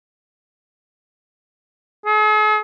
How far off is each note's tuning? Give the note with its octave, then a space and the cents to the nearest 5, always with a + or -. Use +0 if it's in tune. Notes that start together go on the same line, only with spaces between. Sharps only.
G#4 +45